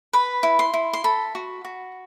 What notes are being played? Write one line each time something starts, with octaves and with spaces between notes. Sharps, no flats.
B4 B5
E4
C6
E4
C6
A4 B5
F#4
F#4